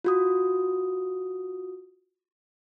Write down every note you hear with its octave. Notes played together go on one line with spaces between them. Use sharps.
F4 F#4 D#6